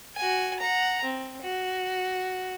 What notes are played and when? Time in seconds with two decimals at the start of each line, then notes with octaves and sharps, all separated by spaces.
0.16 F#4 G#5
0.60 F#5 A#5
1.03 C4
1.42 F#4